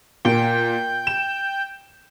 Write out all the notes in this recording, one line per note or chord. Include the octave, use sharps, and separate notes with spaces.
A#2 G5
E7